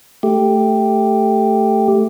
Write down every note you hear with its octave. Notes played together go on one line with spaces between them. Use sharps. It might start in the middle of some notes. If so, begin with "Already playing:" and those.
A3 G4